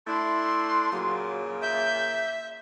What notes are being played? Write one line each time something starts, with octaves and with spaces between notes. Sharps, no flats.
A3 D4 E4 C6
A#2 C#3 F#3 A#3
E5 G6